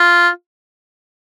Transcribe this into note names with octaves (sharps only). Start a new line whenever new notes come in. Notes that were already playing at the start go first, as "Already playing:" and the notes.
Already playing: F4